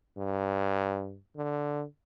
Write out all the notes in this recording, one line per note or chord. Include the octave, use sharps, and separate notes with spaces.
G2
D3